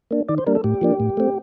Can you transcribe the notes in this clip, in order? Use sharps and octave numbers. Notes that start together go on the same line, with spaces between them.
A#3 D4
D#3 D5
C5
G3 A#3 D4 A#4
A4
A2 G4
F3 A#3 D4
A2
A3 C4